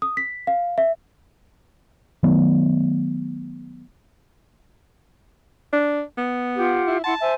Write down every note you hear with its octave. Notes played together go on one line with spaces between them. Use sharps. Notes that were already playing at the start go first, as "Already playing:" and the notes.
D#6
B6
F5
E5
D#3 F#3 A3 B3
D4
B3
F4 G4 F#5
E4
E4 F#5 A5 C6
C5 E5 G#5